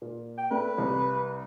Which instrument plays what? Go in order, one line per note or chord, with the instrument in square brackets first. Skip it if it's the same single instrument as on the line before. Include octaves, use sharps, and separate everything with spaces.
[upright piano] A#2
[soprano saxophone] G5
[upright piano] A3 D5 [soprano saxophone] B4
[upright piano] C2